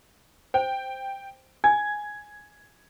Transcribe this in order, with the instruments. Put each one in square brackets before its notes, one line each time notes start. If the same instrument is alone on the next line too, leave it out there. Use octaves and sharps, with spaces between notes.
[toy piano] C5 [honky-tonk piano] G5
[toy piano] G#5 [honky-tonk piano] G#6